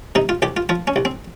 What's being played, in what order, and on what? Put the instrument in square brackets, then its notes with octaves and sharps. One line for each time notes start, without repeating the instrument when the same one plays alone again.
[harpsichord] C3 D#4
F4
C2 G4
F4
F3 F4
C#4
C2
C4